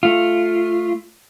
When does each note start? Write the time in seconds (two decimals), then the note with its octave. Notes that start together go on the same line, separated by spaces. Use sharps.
0.03 A3 F4